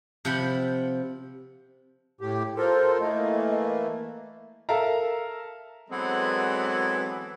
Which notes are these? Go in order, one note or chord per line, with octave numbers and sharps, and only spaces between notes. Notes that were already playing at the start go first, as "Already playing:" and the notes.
C3 F3 F#5 G5 B5
A2 G4
F4 A4 A#4 C5
E3 A3 A#3 D#5
A4 A#4 E5 F5 A#5
E3 F#3 G#3 B3 C4 A4